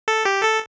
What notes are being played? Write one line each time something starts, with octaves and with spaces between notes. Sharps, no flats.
A4
G4
A4